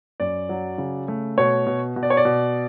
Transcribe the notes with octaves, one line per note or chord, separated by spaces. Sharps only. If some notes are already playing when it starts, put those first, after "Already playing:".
F#2 D5
F#3
C#3
A3
B2 C#5
B2
B2
D5
C#5
D5
B2